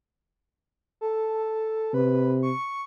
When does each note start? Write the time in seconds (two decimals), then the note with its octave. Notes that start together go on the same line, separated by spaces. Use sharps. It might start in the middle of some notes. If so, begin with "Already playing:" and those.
1.01 A4
1.94 C3 B4
2.43 C#6